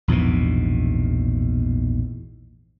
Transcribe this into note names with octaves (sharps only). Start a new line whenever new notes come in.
A#1 E2 G#2 B2